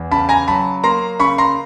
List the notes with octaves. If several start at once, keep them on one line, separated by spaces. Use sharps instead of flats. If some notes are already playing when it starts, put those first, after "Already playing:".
Already playing: E2
C#3 A5 B5
G#5 A#5
F#3 A5 B5
A#3 A#5 C6
C#3 B5 C#6
A#5 C6